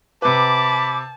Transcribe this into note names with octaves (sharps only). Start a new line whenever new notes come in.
C3 B4 A5 B5 D6